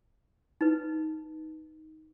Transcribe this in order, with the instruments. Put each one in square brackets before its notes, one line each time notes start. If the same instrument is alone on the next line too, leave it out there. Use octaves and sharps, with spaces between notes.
[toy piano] D#4 B4